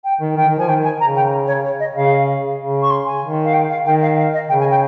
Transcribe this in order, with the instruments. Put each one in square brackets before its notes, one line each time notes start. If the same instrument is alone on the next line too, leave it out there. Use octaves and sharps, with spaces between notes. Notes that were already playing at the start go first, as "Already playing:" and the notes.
[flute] G5
[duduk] D#3
[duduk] D#3 [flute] G5
[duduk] D#3
[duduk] F3 [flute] G#5
[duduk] D#3 [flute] G5
[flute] G#5
[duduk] C#3 [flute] A#5
[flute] G5
C#5
C#5
D#5
[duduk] C#3 [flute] F5
[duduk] C#3
[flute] C#6
C6
G#5
[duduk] D#3
[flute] F5
G5
F5
[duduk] D#3 [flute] G5
[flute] F5
F5
D#5
[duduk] C#3 [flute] G5
[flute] G#5
G5